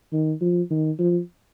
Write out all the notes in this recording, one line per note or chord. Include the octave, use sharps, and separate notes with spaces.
D#3
F3
D#3
F3